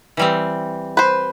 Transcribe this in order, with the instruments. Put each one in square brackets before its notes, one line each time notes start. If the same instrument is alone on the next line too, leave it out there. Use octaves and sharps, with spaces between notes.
[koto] E3 G3 C4
[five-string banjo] B4 C5